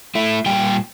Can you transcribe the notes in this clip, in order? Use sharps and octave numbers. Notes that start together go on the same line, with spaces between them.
A3 E4
A#2 G3 G5